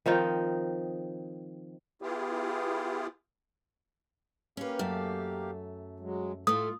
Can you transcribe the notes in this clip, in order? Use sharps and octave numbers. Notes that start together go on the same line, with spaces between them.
D#3 F3 C4 D#4
B3 E4 F4 G4 G#4
A#3 C#4 G4 B4 F5
F#2 A3
F#3 G#3
A2 A3 F4 D#6